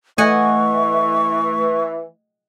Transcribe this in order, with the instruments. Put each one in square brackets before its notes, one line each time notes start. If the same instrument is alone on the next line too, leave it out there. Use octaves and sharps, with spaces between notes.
[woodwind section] E3 [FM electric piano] A3 [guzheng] D#5 F#5 G#5 [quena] C#6